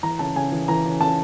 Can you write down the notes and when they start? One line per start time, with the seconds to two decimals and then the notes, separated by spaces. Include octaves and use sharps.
0.03 E3 A#5
0.19 C#3 A5
0.36 C#3 G#5
0.52 E3
0.68 E3 A#5
0.85 C#3
1.01 C#3 A5